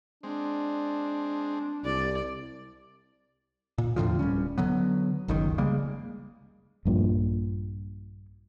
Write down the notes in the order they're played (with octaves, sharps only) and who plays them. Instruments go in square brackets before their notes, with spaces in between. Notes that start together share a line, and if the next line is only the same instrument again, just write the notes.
[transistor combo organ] G#3 C4 [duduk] D4
[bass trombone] C2 [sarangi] D5
[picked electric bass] A#2
E2 A2 D3 F3
D1 G3 C#4
D3 F#3 B3
G1 C#2 F#2 D#3
C#3 G3 G#3 A#3
[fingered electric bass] A#1 G2 A#2